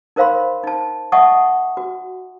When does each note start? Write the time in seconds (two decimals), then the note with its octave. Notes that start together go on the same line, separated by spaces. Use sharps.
0.16 D#4 A#4 C5 F5 B5 C6
0.64 D#4 A5
1.12 D#5 E5 F#5 A5 C#6 D#6
1.77 F#4